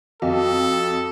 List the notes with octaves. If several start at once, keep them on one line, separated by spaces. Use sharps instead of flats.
F2 F#4 A4 D#5 F5